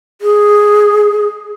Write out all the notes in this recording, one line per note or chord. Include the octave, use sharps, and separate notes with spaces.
G#4